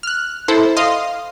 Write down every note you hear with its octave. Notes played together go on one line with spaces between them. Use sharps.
F6 F#6
E4 A4 C5
D#5 F5 C6 D#6